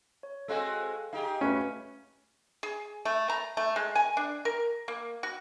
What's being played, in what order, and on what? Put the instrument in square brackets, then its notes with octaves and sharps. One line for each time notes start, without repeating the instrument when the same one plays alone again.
[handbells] C#5
[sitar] G#3 C4 F#4 [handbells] A4 F5 G#5
[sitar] D#4 G4 G#4 [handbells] F5
[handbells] A3 F#4 C#5 [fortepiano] C#4 B4
[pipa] G#4
A3
A#5
A3
G#3
G#5
D4
A#4
A#3
F#4